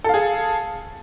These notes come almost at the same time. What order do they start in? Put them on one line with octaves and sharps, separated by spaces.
A4 F5 G#4